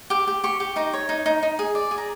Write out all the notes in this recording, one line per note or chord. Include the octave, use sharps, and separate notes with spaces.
G4 D6
G4
G4 C#6
G4
D#4 A#5
C#5
D#4
D#4
D#4
G#4
D5
G#4
A#5